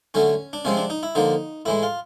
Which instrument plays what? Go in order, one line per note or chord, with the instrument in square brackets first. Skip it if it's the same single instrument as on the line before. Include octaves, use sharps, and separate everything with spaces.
[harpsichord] D3 F#3 A3 C#4
D4
C3 F3 G#3 C4 C#4
D4
D#4
E4
D3 F3 A#3 D#4
A2 E3 G#3 E4
F4